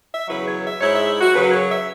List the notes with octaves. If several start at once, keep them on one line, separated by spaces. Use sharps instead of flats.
E5
E2 C#3 F#3 E4 B4
C#5
E5
G#2 G#3 E4 C#5
E5
F#4
F#2 C#3 F#3 B4
C#5
E5